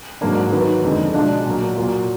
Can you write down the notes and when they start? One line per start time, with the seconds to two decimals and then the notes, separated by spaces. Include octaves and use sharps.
0.21 G#2 F#3 A#3 D4
0.52 D#3 F#3 B3 D#4
0.83 F2 D3 G#3 D#4
1.14 B2 G#3 D4 F4
1.45 A#2 F#3 A#3
1.77 A#2 F#3 A#3 F4